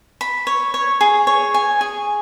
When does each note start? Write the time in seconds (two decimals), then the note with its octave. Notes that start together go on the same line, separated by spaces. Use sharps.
0.21 B5
0.47 C#5
0.74 C#5
1.01 G#4
1.27 C#5
1.54 G#5
1.81 G#4